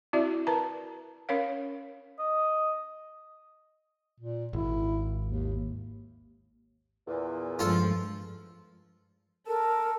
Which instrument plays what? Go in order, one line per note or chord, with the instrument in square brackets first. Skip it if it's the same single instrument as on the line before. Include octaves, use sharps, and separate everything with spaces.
[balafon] C4 E4 F#4 D5 E5
A#4 B4 A5 A#5
C#4 A#4 C#5 F5
[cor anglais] D#5
[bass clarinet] A#2
[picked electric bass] G#1 [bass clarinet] E4
[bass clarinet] D#2
[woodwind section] E2 A#2
[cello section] G2 F3 G#3 [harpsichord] F4 A4
[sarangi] A4 [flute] A#4